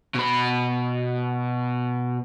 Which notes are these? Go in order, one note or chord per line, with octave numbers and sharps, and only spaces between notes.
B2 B5